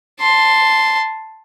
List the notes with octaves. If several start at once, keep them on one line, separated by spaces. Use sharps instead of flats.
A5 C6